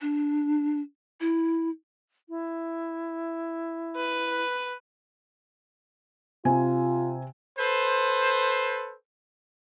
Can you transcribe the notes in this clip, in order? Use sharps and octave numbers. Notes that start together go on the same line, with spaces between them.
D4
E4
E4
B4
C3 F4 G#5
A4 B4 C5